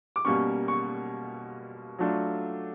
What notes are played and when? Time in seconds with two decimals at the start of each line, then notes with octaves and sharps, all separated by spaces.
0.16 D6
0.25 B2 G3 A#3 C#4 C#6
0.68 C#6
1.98 F#3 A3 D4 F4